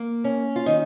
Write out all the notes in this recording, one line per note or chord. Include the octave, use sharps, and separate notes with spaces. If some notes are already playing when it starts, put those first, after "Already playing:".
Already playing: A#3
C#4
F4
D#3 D#4